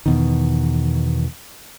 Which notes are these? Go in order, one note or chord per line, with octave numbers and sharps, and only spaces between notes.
E2 B2 D#3